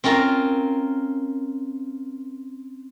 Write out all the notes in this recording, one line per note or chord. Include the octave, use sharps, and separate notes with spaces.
C4 C#4 F4 A#4